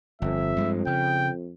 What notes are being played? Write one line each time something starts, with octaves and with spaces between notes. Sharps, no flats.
G1 F2 E5
G2 G3 G#3
C#3 G5